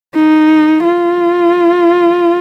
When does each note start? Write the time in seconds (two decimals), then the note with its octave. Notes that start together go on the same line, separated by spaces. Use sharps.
0.15 D#4
0.83 F4